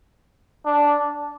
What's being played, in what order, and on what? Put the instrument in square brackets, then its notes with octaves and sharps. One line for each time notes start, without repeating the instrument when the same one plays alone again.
[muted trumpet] D4